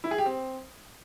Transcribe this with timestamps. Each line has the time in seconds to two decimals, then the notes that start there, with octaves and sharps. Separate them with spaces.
0.04 E4
0.11 G#4
0.18 G4
0.26 C4